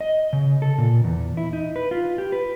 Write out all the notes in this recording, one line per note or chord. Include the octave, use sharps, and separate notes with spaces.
D#5
C#3
A4
A#2
E2
E4
D#4
B4
F4
G4
B4